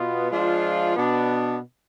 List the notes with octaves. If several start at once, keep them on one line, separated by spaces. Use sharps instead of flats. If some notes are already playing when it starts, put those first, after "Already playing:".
Already playing: B2 B3 F4
F3 G#3 D4 F4
B2 B3 D4